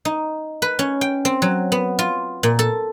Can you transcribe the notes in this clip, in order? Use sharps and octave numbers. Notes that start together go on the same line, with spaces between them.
D#4
B4
C#4
G5
C4
F#3
B3
F4
A#2
A4